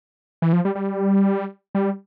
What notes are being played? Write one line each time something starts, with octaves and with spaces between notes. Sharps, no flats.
E3
F3
G3
G3
G3